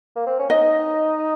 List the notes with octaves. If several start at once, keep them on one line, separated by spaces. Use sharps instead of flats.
A#3
C4
C#4
D#4 D#5